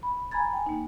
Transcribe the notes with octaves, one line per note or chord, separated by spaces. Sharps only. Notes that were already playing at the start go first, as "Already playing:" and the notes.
B5
G#5 A#5 B5 G#6 A6
G5 G#5
A#3 D#4